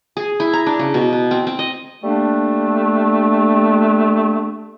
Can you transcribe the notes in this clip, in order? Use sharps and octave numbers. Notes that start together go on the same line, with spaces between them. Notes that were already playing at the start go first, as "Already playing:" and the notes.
G#4
E4
A#5
D4
C#3
B2
B3
C4
C4
D#5
G3 A3 A#3 D4